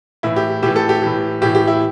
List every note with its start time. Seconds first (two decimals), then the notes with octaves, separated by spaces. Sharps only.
0.23 A2 E3 E4
0.36 G4
0.63 A2 E3 G4
0.76 A4
0.89 G4
1.02 A2 E3
1.42 A2 E3 G4
1.55 G4
1.67 E4